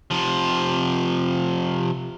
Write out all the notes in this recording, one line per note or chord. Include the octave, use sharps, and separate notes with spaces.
C3 F3